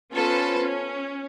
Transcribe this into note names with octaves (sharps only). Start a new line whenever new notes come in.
B3 C#4 F4 A4 B4 C5
C#4